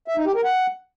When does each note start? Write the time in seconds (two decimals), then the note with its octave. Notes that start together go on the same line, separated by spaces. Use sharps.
0.08 E5
0.17 D#4
0.26 G4
0.35 A#4
0.44 F#5